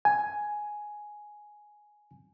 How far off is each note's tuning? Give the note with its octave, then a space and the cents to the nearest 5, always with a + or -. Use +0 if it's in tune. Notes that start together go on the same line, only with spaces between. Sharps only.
G#5 +5